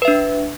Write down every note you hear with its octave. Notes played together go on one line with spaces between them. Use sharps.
D4 B4 E5